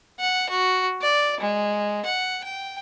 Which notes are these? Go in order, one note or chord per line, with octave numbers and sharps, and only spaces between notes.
F#5
F#4
D5
G#3
F#5
G5